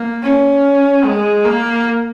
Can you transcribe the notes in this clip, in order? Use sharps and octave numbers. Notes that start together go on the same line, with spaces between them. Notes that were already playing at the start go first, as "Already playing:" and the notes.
Already playing: A#3
C#4
G#3
A#3